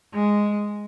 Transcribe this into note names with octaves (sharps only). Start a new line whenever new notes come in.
G#3